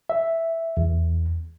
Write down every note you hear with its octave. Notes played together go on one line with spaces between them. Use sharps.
E5
E2